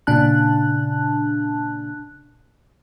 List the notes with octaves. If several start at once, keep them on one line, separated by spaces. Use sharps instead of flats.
A#2 C#3 D4 A5 F#6